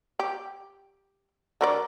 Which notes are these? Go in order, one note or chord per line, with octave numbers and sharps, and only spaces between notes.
G4
D3 A#4 D5